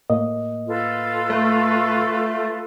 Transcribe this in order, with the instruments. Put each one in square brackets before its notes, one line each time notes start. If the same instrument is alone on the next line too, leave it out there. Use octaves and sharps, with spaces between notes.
[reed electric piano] A2 A#3 D#5
[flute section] F4 A4 B4
[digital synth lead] A3